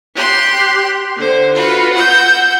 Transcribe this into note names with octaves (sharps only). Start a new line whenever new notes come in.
G4 C6 F#6
D3 C5
F4 F#4 B4
F#5 E6 G6